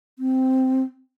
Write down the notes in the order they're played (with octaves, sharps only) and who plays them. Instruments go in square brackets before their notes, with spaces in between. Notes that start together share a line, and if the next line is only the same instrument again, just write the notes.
[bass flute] C4